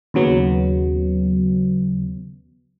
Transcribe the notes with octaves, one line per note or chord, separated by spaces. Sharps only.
D#2 C#3 F#3 B3